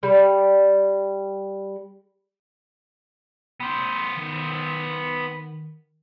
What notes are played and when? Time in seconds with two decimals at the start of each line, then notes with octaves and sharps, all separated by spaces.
0.03 G3 D5
3.60 B3 C5
4.17 D#3